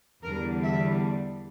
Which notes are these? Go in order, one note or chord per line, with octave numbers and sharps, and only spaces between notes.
E2 D3 G3 A#4
E5